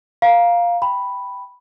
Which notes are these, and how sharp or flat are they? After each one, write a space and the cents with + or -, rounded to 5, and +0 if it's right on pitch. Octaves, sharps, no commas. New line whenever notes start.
F5 +0 A#5 +20
G5 +0 B5 +0